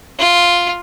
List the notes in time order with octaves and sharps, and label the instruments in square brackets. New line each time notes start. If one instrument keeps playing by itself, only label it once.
[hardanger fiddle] F4